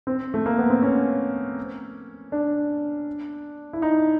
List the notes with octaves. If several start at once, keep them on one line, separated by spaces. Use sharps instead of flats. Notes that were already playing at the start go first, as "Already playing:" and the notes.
C4
A3
A#3
B3
C4
C#4
D4
E4
D#4